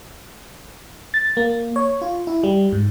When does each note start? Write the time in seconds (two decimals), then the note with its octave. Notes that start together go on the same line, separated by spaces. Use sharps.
1.14 A6
1.37 A#3
1.76 C#5
2.02 F4
2.27 E4
2.44 G3
2.72 G#2